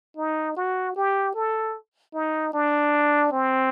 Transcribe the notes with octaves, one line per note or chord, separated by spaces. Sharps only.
D#4
F#4
G4
A4
D#4
D4
C4